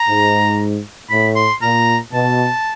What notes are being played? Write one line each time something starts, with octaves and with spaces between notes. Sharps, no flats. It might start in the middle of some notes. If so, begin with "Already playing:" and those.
Already playing: A#5
G#2
A2 B5
C6
A#2 A#5
B2 A5